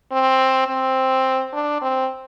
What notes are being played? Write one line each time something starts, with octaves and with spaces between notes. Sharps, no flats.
C4
C4
D4
C4